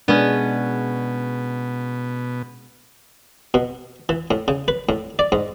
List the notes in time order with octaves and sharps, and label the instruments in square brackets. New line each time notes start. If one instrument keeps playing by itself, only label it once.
[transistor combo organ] B2 [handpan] G#3 D4 [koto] B3 C#4
[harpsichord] B2
E3
A2
C#3
B4
A2
D5
G#2